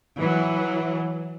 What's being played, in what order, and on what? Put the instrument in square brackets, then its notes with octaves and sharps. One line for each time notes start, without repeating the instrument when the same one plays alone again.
[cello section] E3 F#3